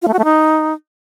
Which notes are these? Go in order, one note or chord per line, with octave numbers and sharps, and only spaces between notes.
F4
A3
F#4
A3
D#4